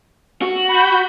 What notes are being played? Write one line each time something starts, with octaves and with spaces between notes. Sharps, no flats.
F#4
B5 G6